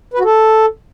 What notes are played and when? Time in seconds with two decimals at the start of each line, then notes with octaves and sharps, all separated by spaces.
0.14 B4
0.19 F#4
0.25 A4